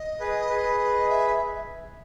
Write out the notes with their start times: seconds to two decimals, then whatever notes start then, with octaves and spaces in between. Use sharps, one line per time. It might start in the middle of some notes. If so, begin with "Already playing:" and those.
Already playing: D#5
0.20 G#4 B4
0.49 G#4 B4
1.09 E5